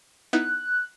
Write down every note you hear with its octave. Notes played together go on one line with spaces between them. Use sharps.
B3 D#4 E4 F#6